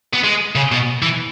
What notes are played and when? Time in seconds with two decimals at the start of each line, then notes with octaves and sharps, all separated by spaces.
0.14 B3
0.24 G#3
0.56 C#3
0.72 B2
1.03 E3